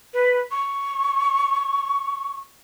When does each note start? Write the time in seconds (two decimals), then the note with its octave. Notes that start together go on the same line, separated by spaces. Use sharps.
0.14 B4
0.51 C#6